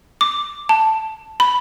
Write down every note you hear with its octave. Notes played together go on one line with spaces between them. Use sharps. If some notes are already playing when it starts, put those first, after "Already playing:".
D6
A5
B5